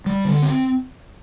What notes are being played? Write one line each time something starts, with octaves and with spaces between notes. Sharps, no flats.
G3
D3
C4